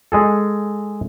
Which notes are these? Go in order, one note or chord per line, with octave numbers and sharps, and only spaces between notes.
G#3 G#4 A4